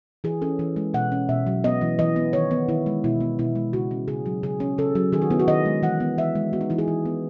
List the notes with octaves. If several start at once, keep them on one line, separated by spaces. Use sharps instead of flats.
E3 G#4
C#4 A4
E3
G#3
B2 F#5
C#4
B2 E5
F#3
B3 D#5
E3
E3 D#5
B3
D#3 C#5
B3
D#3 E4
G#3
B2 E4
B3
B2 E4
G#3
C#3 F#4
C#4
C#3 G#4
F#3
C#3 G#4
C#4
C#3 A4
F#3
D#3 G#4
F#4
B3 E4
F#4
D#3 D#5
G#3
E3 F#5
B3
E3 E5
G#3
B3 F#4
D#4
E3 E4
G#4
E3
B3